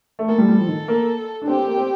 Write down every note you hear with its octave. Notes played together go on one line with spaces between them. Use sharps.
A3
A#3 A4
G3
G3
F3
D#3
A#3
D4
C4 G4
C4
A#3
C4